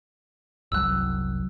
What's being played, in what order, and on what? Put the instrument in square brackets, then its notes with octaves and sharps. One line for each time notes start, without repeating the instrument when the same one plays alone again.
[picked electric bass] F#1 C2 F#3 [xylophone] E6 F#6